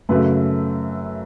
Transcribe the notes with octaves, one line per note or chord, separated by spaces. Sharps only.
F#2 C#3 F#3 A3 B4